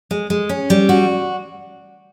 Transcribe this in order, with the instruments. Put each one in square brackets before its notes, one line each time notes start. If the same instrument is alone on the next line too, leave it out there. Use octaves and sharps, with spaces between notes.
[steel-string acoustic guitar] G#3
G#3
C#4
G3
F#4